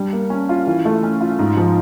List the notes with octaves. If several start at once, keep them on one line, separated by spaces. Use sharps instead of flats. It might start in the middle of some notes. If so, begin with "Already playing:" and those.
Already playing: G3 D4
A#3
C#4
F4
E3
A3
C#4
F4
G#2
F3